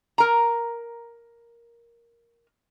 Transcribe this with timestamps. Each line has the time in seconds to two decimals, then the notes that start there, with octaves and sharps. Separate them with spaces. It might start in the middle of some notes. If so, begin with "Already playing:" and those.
0.18 A#4 A#5